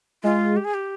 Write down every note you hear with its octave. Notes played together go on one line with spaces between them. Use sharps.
G#3 F4
G4
G#4
G4